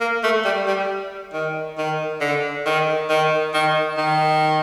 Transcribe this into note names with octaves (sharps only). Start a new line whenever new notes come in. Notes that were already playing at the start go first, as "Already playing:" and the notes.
A#3
A3
G3
G3
D#3
D#3
D3
D#3
D#3
D#3
D#3